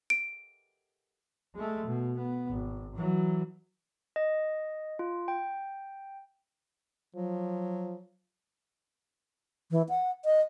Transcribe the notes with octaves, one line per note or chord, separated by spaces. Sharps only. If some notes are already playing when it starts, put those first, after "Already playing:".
D7
G#3 A3
B2
B3
G#1
E3 F#3
D#5
F4
G5
F3 F#3
E3
F#5
D#5